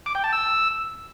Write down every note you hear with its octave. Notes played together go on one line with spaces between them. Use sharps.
D6
G5
A5
E6